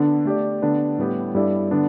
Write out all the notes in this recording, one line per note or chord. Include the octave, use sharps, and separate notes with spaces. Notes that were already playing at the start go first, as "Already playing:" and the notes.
Already playing: D3 B3 D4
A3 G4 D5
D3 B3 D4 B4
A2 G3 B3 G4
G2 G3 E4 A4 D5
D3 B3 D4